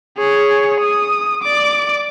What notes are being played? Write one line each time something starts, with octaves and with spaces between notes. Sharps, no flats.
G#4 C#5
D#6
D5 D6